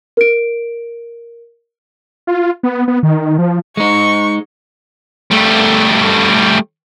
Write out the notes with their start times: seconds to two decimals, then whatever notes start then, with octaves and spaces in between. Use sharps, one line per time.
0.17 A#4 D7
2.27 F4
2.63 B3
2.88 B3
3.03 D#3
3.38 F3
3.77 G#3 D#4 C#6
5.31 G3 A3